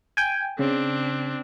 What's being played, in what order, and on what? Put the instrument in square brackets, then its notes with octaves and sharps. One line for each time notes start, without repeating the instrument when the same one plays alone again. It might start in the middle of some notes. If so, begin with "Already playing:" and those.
[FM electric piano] G5 G#5
[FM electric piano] C#3 [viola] C4 D4